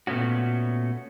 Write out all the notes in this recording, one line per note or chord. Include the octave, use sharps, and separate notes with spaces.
A#2 A3 B3 C#4 F#4